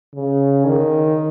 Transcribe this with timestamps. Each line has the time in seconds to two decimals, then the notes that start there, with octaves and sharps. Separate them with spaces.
0.16 C#3
0.66 D#3